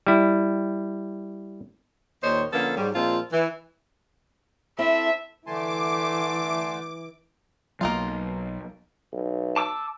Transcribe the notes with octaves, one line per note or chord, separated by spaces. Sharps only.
G3 E4
D#2 A#2 D#3 C5 C#5 D#5
D3 F3 A#3 B3 C#4 A4
G#2 F#3 G3
A#2 F3 G#3 A#3 C4 F4
E3
C4 E4 A4 E5
D3 E3 A3 G#5 A5 C6 D6
B1 F#3 A#3 D#4 F4
B1
A5 D6 E6